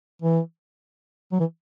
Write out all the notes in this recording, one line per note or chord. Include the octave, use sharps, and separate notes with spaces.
E3
F#3
E3